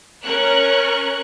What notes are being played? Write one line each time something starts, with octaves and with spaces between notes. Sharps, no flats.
C#4 A#4 C#6 F#6